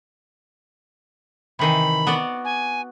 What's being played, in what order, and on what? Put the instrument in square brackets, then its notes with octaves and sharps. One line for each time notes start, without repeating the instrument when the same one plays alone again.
[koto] C3 D#3 E3 [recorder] B5
[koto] B3 F#4 D5
[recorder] G#5